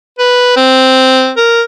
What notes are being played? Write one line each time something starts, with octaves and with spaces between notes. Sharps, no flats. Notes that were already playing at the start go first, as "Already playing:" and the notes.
B4
C4
A#4